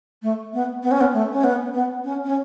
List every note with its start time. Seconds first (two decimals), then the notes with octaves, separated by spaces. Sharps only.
0.23 A3
0.54 B3
0.83 B3
0.91 C#4
1.01 B3
1.13 A3
1.32 C#4
1.44 B3
1.74 B3
2.04 C#4
2.25 C#4